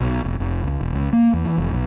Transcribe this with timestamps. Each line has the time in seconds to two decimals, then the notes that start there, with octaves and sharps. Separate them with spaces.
0.01 B1
0.24 F1
0.40 F1
0.64 C#2
0.81 E1
0.93 C#2
1.13 A#3
1.33 E2
1.45 E3
1.58 F1
1.71 B1